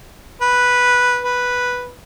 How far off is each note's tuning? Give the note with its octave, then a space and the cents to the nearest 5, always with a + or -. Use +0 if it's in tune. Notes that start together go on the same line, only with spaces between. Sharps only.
B4 -5
B4 -5